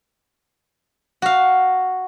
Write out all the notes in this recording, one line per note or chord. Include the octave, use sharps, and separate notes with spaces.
F#4 F5